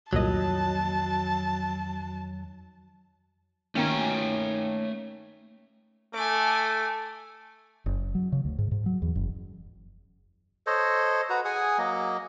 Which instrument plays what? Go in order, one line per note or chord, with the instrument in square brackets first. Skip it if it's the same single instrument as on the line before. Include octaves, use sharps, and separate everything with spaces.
[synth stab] C2 A#2 D#5 [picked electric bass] F2 D#3 [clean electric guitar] F#3 [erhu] A5
[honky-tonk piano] D#3 A#3 D#4 [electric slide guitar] A3 G5 A#5 [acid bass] C#4
[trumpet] A3 [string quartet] G#5 D6
[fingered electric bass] F#1
F#3
C#3
D2
G#2
G#2
F#3
E2
F#1
[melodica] A4 C5 C#5 D#5
F#4 B4 A#5
G#4 F#5 G#5 D#6
F#3 A#3 D#5